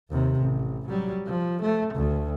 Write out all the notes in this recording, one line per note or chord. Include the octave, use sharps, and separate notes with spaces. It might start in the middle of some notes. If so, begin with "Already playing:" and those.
D#2 C3
A1
F#3 G3
F3
A3
D2